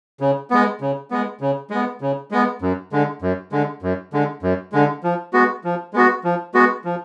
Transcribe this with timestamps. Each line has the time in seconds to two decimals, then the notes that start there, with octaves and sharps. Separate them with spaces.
0.20 C#3
0.50 G#3 B3
0.81 C#3
1.11 G#3 B3
1.41 C#3
1.70 G#3 B3
2.01 C#3
2.31 G#3 B3
2.62 F#2
2.92 D3 G#3
3.22 F#2
3.52 D3 G#3
3.82 F#2
4.13 D3 G#3
4.43 F#2
4.72 D3 G#3
5.03 F3
5.33 G#3 B3 F#4
5.64 F3
5.94 G#3 B3 F#4
6.24 F3
6.54 G#3 B3 F#4
6.84 F3